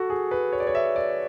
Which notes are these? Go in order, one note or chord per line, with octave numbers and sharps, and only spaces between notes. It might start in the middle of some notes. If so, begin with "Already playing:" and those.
Already playing: F#4 A4
G#4
B4
C#5
D5
C#5
E5
D5